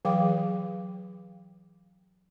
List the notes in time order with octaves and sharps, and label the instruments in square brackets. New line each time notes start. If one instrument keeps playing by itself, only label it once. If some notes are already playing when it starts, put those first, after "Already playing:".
[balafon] E3 F#3 G#4 F5 G5 D6